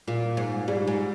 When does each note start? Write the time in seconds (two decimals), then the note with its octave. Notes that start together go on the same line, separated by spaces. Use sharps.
0.07 A#2 F4
0.37 G#2
0.68 G#2 G3
0.87 G#2